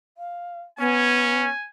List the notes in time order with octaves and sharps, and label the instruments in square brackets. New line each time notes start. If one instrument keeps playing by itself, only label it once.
[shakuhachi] F5
[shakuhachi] B3 [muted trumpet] C#4 [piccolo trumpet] G#5